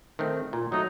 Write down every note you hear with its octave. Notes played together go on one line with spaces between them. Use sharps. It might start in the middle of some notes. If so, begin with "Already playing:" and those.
D#3 A3 C4
A#2
F#3 A3 D#4